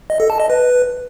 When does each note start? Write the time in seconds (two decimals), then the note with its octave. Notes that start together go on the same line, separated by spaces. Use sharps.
0.10 D#5
0.20 A4
0.30 A5
0.40 D#5
0.50 B4